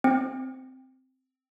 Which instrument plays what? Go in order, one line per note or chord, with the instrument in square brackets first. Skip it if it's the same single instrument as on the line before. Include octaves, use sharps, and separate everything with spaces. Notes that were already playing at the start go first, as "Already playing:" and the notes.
[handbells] C4